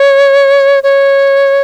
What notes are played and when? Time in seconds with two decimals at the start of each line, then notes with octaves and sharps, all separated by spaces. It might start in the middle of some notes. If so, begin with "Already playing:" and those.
Already playing: C#5
0.83 C#5